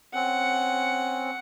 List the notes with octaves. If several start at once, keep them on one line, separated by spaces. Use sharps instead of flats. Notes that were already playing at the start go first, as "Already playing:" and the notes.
C4 C#4 F#5